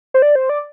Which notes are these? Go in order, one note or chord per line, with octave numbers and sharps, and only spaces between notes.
C5
D5
C5
D5